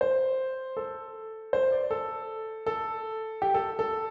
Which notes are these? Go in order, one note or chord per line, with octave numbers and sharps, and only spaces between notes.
C5
A4
C5
D5
A4
A4
G4
A4
A4